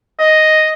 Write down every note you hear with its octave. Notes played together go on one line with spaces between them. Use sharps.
D#5